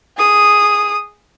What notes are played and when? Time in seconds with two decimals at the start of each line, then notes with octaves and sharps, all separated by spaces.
0.17 G#4 D#6